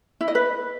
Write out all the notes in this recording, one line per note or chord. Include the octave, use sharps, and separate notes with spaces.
E4
D#5
B4